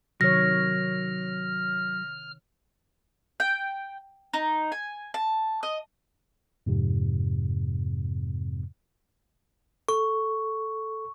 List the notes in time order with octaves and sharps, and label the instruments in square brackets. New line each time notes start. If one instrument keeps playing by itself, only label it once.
[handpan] C3 D#3 C#5 [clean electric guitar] F#3 [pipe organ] F6 [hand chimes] A#6
[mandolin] G5
D#4
G#5
A5
D#5
[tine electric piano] F2 G#2 C3
[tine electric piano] A4 [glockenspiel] C#6